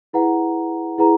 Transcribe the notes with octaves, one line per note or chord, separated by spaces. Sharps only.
E4 G#4 B4 F#5 A#5
E4 G#4 B4 F#5 A#5